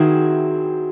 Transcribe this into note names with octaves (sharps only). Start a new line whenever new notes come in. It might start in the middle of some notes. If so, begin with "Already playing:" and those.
Already playing: D#3 F#3 C4 E4 G#4